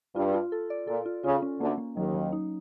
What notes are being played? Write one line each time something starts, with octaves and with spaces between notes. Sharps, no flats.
G2 F4
F4
A4
D5
A#2 A4
F4
C#3 F4
C#4
D2 D3 A#3
A#3
D#2 D#3 F#3
F#3
D#4